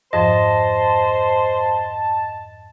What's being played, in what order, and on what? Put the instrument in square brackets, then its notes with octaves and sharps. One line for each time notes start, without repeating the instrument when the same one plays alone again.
[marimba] F2 G#2 F3 [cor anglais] C5 [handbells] D#5 [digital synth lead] A5